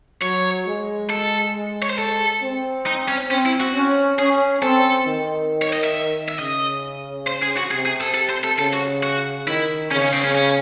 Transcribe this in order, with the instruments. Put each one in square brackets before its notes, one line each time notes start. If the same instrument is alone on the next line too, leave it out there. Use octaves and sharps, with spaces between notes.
[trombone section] F#3 [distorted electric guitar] C#5
[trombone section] G#3
[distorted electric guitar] A4
C#5
C5
A4
[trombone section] C4
[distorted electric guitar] D#4
C#4
[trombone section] C4 [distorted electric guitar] C#4
[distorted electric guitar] E4
F#4
[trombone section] C#4
[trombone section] C#4 [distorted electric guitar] G#4
[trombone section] C4 [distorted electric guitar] A4
[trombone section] D#3
[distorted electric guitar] C#5
D#5
E5
E5
[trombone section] C#3 [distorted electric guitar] D#5
[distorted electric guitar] C5
G#4
F#4
[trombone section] C3 [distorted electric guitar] G#4
[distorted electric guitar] G#4
A4
A4
C5
A4
[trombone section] C#3 [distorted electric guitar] A4
[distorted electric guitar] F#4
F#4
[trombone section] D#3 [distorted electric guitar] E4
[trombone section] C#3 [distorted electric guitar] C#4
[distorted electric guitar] C#4
C4
C#4
C#4